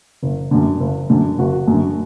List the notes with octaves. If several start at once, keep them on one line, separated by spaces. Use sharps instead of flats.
F#1
F#2 D3
F#1
F#2 D3
F#1 F#4
F#2 D3